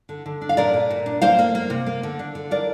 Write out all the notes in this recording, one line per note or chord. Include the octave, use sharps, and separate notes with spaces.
D3
D3
D4
F5
A#2 A#4 D5
A#2
A#2
D4
A#3 C5 F5
A#3
A#3
C3
A#3
D3
D4
D3
D4 A#4 D5